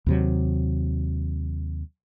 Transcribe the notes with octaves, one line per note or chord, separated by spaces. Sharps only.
D#2 C3 F#3